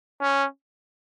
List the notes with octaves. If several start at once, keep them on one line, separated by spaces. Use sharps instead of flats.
C#4